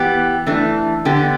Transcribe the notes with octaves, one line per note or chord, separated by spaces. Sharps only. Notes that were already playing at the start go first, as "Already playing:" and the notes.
Already playing: E3 B3 G4
E3 A3 D4
D3 B3 G4